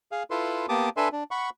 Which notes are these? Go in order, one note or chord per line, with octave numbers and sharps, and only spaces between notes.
G#4 F5
E4 F4 A4 B4 C6
A#3 B3 G4 A5 D6 D#6
D4 A4 B4 E5 G#5 C6
D4
F#5 B5 C#6